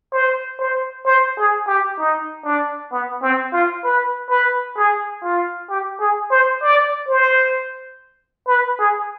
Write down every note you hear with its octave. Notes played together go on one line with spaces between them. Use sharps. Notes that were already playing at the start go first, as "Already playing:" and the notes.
C5
C5
C5
G#4
G4
D#4
D4
B3
C4
F4
B4
B4
G#4
F4
G4
G#4
C5
D5
C5
B4
G#4